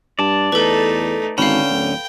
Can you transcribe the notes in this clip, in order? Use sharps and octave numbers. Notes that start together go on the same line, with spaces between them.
G2 D5 A5
E2 A3 D#4 A4 B4
G#1 D3 C#4 F5 G5 B5
D1